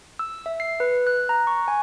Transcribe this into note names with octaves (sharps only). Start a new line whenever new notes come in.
E6
E5
C7
B4
F#6
A#5
C#6
G#5